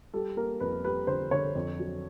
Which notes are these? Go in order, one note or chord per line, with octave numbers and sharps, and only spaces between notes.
G3 A4
A#3 A#4
F2 B4
G3 B4
D3 C5
D3 C#5
F2
F#3